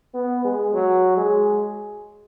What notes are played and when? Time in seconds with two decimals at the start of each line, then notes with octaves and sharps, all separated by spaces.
0.15 B3
0.44 G#3
0.73 F#3
1.17 G#3